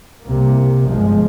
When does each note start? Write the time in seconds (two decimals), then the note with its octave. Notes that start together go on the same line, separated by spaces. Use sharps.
0.24 C2 C3 A#3
0.87 G1 F3 G#3